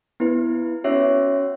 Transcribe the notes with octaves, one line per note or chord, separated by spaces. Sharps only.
B3 E4 B4
C#4 F#4 C#5 E5